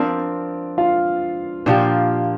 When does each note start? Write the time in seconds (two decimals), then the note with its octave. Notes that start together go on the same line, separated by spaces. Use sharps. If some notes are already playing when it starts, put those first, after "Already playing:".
Already playing: F3 C4 D4 A#4 D5
0.78 F4 F5
1.66 A#2 F3 A#3 D4 G4 D5